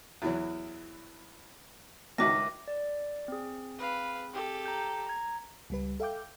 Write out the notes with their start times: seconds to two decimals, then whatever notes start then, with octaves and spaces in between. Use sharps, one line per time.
0.22 E2 E3 F#3
2.18 C#2 D#3 F#4 E5 D6 A#6
2.68 D5
3.28 C4 G#4
3.78 B4 F5
4.33 G4 A4
4.66 A#5 G6
5.07 A#5 G#6
5.70 C#2 G3 B4
6.00 A4 E5 F5 G5 D6 G6